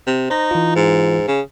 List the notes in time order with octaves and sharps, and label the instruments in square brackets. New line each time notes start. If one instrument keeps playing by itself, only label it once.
[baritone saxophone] C3
[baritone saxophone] D#4 [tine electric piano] C5 A#6
[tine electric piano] E3 F4
[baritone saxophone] G#2
C#3